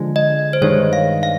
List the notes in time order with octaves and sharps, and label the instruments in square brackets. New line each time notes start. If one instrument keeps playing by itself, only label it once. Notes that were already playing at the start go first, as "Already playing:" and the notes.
Already playing: [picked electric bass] D3 F3 G#3
[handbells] D#5
C5
[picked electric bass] G2 D#3 G#3 [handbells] C#5
[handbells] F5
F5